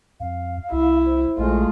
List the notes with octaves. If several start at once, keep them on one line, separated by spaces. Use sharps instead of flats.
F2 F5
C2 E4
C5
A#1 G#3 A3 F4